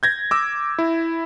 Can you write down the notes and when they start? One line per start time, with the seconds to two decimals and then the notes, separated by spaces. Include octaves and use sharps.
0.03 G6 G#6 A#6
0.31 D6 E6
0.79 E4